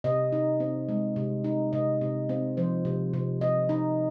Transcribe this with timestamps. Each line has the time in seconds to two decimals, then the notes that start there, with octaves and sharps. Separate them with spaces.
0.04 C3 D#5
0.32 D#4
0.60 C4
0.89 G#3
1.16 C3
1.44 D#4
1.73 C3 D#5
2.01 C3
2.29 C4
2.57 F3 C5
2.85 C3
3.13 C3
3.41 C3 D#5
3.69 D#4